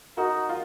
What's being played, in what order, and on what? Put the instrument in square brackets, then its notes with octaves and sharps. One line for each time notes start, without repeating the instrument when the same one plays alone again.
[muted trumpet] D#4 [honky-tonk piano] F#4 A#4
[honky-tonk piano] F4